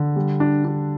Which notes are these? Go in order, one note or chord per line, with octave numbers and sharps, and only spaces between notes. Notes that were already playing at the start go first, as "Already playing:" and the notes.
Already playing: D3
G3
D4
D4